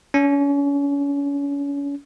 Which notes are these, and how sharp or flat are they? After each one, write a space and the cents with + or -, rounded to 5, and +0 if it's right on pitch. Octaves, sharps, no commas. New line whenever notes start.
C#4 +35